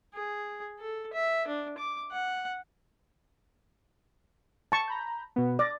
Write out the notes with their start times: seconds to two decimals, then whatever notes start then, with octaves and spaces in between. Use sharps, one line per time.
0.14 G#4
0.79 A4
1.13 E5
1.47 D4
1.78 D6
2.11 F#5
4.72 A5 C#6
4.88 A#5 B5 G6
5.36 B2 B3
5.59 D5 D6 A#6